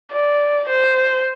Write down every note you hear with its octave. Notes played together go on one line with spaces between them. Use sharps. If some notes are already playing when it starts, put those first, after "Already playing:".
D5
C5